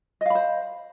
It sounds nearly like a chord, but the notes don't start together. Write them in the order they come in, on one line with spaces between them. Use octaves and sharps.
D#5 F5 B5 C5